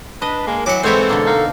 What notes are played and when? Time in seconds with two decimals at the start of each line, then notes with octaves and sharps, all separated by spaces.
0.22 D4 B4 D#5
0.47 G#3 A#3
0.66 E3 F#3 F#5 D6
0.84 G#2 E3 C4 A4 C5 C#5 E5
1.09 B2 D3 A#3
1.26 D#4 A#4 F5